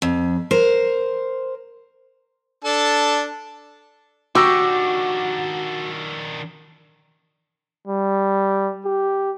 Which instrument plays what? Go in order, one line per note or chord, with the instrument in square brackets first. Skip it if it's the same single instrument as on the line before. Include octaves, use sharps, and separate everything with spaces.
[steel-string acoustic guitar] F2
A#4 C5
[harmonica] D4 A4 A5
[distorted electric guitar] D#3 D4 [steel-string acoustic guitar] F#4 [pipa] G4 [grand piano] C#6 E6 A#6
[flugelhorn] G3
G4